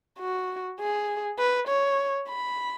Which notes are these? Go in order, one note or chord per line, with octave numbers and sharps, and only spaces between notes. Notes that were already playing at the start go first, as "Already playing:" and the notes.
F#4
G#4
B4
C#5
B5